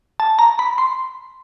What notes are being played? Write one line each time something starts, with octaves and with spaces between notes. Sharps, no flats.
A5
A#5
B5
C6